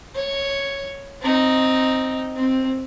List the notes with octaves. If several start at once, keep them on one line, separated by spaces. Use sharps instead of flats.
C#5
C4 D#4
C4